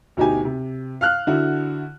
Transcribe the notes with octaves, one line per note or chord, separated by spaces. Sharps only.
D2 B2 D#4 G4 G#5
C3
F5 F6 F#6
D3 E4 F#4